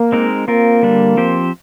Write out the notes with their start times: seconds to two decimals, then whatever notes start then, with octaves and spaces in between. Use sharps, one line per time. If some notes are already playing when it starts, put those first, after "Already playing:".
Already playing: A#3
0.12 G#3 C4 D#4 A#4
0.48 A#3 C4 F4 A#4
0.82 D3 G3 D4
1.17 F3 C4 G4 C5